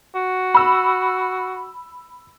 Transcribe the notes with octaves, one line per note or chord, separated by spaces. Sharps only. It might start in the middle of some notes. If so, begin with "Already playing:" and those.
F#4
B5 E6